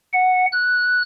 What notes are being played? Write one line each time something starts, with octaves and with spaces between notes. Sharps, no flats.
F#5
F#6